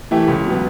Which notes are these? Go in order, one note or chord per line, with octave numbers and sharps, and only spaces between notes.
E3 A3 E4 G4
C#2
B2 F#3 B3